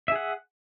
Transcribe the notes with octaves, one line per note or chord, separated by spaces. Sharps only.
G#4 E5 F#5